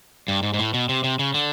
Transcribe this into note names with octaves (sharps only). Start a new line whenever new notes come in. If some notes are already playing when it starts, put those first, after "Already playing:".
G2
G#2
G#2
A2
B2
C3
C3
C#3
D3